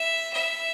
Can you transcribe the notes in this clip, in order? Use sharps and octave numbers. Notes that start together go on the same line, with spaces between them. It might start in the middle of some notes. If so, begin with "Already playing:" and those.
Already playing: E5
E5